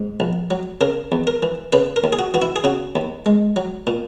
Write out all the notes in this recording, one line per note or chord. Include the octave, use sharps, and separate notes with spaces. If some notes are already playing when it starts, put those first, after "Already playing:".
Already playing: G#2
A#1
F#3
C#3 A#4
E2
A#4
E3
C#3 B4
A#4
D#2
G#4
F#4
E3 F#4
E4
G#4
C#3 F#4
D#2
G#3
F#3
A#2